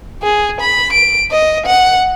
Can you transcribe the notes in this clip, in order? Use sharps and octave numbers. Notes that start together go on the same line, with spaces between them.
G#4
B5
D7
D#5
F#5